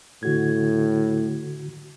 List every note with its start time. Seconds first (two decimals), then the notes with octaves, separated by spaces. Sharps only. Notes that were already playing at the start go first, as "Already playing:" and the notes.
0.23 A2 D3 F#4 G#6